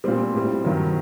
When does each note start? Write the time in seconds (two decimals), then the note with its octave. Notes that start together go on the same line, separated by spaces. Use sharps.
0.04 A#2 G3 C4
0.34 A2 G3
0.65 G2 D#3 F#3